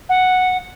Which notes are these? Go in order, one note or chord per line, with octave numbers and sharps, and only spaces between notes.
F#5